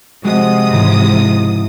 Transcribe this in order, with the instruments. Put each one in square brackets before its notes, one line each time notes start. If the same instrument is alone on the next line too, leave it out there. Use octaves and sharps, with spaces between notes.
[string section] C3 F3 D#6 [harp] G#3 F#4 D#5
[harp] G#2 C#3 E3